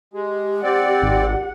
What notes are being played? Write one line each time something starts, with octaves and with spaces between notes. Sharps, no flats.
G#3 G4
C4 D5 F#5
G#1